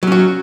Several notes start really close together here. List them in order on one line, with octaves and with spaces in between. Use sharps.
F#3 C#4 F#4